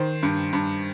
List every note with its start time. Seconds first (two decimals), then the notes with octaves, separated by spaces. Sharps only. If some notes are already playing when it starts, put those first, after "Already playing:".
Already playing: D#3 C5
0.23 G2
0.53 G2